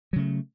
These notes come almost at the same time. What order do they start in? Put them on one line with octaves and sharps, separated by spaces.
F#3 C#3 A3